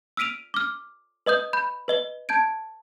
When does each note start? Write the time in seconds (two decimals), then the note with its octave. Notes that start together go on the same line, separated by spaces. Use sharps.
0.17 E6 F6 B6 D7 D#7 F7
0.54 D6 F6
1.26 B4 D#5 D#6 G6
1.53 B5 G6
1.88 B4 D#5 G7
2.29 A5 G6 G#6 D7